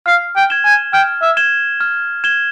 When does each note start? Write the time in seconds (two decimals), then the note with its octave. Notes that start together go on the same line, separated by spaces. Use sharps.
0.06 F5 F6
0.36 G5
0.50 G#6 E7 G7
0.65 G#5
0.93 G5 F6
1.22 E5
1.37 G#6 E7 G7
1.81 F6
2.24 G#6 E7 G7